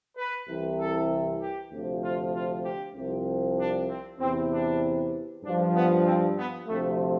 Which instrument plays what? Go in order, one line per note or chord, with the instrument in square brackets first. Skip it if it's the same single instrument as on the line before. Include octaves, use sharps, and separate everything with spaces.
[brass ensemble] B4
C2 C3 E3
A4
G4
D2 C3 F3
F4
F4
G4
C2 C3 F3
D4
C4
E2 C3 E3 C4
D4
G2 F3 D4
B3
C4
B3
D2 C3 F3 A3